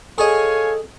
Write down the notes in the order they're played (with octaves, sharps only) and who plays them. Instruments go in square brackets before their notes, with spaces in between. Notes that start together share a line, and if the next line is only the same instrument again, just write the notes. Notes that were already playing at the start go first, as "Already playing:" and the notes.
[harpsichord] G#4 D#5 [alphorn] A4 [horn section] C#5 F5 G#5